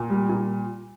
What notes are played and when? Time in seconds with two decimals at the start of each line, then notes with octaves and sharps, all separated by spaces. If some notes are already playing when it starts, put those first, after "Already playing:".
Already playing: A#2
0.10 G3
0.29 A#2